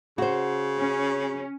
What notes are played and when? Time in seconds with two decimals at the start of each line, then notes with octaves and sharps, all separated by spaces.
0.18 C#3 F#4 C5
0.78 C#4